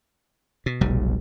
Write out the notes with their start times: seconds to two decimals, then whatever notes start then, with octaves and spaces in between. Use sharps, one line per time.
0.66 B2
0.81 F1 B1 A#2 G3